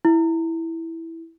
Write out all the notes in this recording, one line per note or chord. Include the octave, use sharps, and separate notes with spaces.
E4